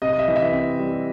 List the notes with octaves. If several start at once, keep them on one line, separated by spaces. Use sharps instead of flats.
C3 D#5
D#5
E5
E3
E5
C4
G3